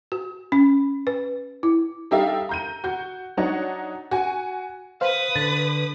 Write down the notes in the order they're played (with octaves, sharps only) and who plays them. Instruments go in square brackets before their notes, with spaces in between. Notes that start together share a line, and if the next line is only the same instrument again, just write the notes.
[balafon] F#4
C#4
B4
E4
[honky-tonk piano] G3 D#4 G4 A4 E5 F5
A#5 G6 D#7
F#4 G6
F#3 D4 D#4 C#5 F#5
F#4 G#5
[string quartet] B4 D#6 [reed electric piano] C5 F5
[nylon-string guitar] D3 [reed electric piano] A6